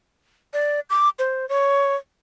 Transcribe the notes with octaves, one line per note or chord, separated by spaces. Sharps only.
D5
D6
C5
C#5